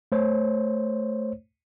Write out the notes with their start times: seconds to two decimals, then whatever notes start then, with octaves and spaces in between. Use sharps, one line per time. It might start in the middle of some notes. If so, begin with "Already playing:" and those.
0.12 A3 C5 C#5